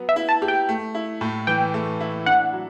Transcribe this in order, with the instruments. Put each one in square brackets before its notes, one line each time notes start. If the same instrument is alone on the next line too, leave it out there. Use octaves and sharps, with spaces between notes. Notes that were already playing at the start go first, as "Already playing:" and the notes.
Already playing: [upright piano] F#3 B3
[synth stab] E5
[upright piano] E4
[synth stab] A5
[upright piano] G4
[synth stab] G5
[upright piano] A3
E4
A2
[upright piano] E3 [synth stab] G5
[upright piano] A3
E4
[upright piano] D4 [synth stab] F#5
[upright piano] F#3